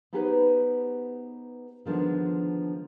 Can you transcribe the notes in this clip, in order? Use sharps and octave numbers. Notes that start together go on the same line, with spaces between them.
B3 D#4 G4 G#4 B4 C5
D3 D#3 F3 G#3 B3 D4